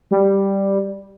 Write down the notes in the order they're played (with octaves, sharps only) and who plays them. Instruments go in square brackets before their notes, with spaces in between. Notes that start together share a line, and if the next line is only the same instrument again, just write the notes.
[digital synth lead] G3